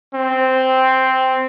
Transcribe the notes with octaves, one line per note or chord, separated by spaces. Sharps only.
C4